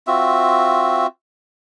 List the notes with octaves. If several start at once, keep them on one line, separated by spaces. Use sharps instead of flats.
C4 F4 F#4 E5